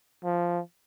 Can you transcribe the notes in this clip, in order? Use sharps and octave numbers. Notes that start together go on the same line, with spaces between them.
F3